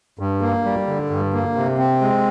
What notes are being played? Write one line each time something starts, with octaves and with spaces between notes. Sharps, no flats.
G2
A#3
G3
D3
G2
A#3
C3
C4
G#3